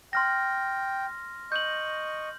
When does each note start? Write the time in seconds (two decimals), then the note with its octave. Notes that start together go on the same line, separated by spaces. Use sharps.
0.13 G5 C6 F6 A#6
1.52 D#5 C#6 G6 F#7